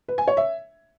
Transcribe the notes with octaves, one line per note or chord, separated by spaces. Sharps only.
B4
G#5
C#5
E5